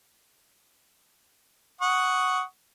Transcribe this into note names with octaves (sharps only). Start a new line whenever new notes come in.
F#5 C#6 D#6